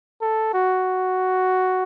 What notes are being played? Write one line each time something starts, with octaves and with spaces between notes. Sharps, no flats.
A4
F#4